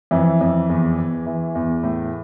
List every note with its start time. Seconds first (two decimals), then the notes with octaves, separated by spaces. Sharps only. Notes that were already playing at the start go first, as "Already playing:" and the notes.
0.11 F2 E3 E4
0.41 F2
0.69 E2
0.98 E2
1.26 E3
1.55 E2
1.83 A2